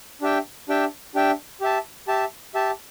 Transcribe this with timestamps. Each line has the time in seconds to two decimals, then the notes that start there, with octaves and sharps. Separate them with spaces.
0.21 D4 G4 E5 G5
0.69 D4 G4 E5 G5
1.15 D4 G4 E5 G5
1.61 G4 E5 A5
2.08 G4 E5 A5
2.54 G4 E5 A5